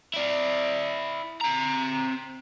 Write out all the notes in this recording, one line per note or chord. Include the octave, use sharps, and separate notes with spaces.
E4 D5
C4 A#5